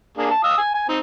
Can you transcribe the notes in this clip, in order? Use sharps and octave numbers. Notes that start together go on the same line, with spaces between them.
A#3 D4 G#4
A5
F5 D#6 E6
G#5
G#5
C4 D#4